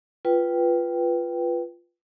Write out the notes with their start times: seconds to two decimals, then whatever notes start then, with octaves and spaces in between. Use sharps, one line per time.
0.25 F4 B4 G5